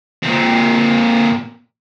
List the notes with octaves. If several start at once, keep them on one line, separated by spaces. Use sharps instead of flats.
A#2 C4